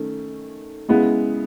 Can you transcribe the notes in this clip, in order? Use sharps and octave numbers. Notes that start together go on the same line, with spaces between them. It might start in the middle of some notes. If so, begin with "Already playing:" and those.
Already playing: D#3 A3 C#4
C#3 G#3 B3 E4